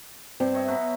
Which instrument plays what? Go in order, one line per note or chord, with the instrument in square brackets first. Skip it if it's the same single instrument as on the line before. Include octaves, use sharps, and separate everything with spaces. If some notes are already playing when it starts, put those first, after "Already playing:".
[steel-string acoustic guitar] G2 C4
[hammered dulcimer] C#5 D#5 E5
B2 F#3 B4